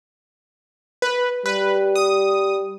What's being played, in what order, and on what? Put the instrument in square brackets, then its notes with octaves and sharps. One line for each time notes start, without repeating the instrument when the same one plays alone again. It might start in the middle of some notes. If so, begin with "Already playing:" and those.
[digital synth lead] B4
[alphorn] G3 [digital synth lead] B4
[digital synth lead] D#6